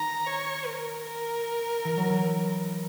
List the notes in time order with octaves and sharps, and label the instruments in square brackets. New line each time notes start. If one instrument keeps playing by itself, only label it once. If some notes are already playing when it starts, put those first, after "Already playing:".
Already playing: [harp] D#3 [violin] A#5
[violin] C#5
A#4
A#4
[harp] E3
F#3
E3